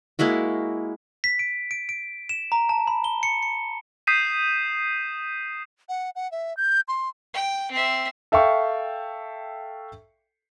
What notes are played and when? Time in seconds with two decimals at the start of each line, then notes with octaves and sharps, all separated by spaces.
0.19 G#3 A#3 E4 F#4
1.24 B6
1.39 D7
1.71 D7
1.89 D7
2.29 E7
2.52 A#5
2.69 A5
2.87 B5
3.04 G7
3.23 C#7
3.42 C#7
4.07 D#6 G6 B6 C7 D#7 E7
5.89 F#5
6.16 F#5
6.32 E5
6.57 G6
6.88 C6
7.34 G5
7.71 C4 E5
8.32 A4 E5 F5 G5 C#6